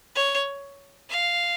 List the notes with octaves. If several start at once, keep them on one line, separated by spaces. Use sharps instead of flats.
C#5
F5